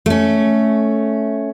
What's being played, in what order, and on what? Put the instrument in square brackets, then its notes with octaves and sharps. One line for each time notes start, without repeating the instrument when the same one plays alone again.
[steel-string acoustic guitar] A3 C#4